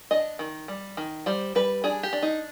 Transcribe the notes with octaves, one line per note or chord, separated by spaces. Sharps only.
D4 D#5
D#3
G3
D#3
G3 C5
G3 B4
D4 G#4
G4
D4
D#4